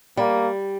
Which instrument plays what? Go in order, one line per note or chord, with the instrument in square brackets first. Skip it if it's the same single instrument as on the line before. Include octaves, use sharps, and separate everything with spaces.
[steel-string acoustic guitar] G3 [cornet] A#3